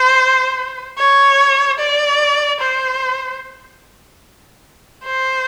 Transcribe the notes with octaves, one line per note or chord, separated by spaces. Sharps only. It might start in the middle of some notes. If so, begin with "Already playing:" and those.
Already playing: C5
C#5
D5
C5
C5